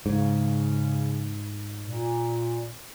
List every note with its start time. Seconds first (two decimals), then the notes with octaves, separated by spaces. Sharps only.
0.06 G#2 C#3
1.85 A#2